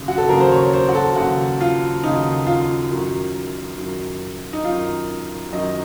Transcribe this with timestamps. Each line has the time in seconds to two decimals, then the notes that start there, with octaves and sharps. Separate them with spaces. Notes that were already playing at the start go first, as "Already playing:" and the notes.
Already playing: D#2 C#3 F#3
0.08 F#4
0.18 A4
0.29 D#2 C#3 F#3 A#4
0.40 C5
0.52 C#5
0.73 C5
0.89 F#4
0.95 A4
1.16 D#2 C#3 F#3 F#4
1.61 F4
2.03 D#2 C#3 F#3 D#4
2.47 F4
2.91 F#2 D#3 F#3
3.78 F#2 D#3 F#3
4.53 D#4
4.65 F#2 D#3 F#3 F4
5.52 F#2 D#3 F#3 D#5